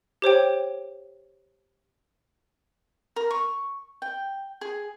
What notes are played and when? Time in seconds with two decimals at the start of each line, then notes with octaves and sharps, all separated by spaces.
0.22 G4 C5 C#5 G5
3.16 A#4
3.31 C#6
4.02 G5
4.61 G#4